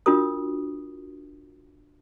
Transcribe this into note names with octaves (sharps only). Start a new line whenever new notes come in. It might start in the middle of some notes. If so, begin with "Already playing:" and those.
D4 F4 F#4 A#4 D#6